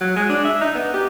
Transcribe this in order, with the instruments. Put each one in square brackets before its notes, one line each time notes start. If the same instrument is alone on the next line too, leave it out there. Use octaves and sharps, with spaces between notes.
[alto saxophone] F#3
G#3
D4
E5
D#4
B3
G4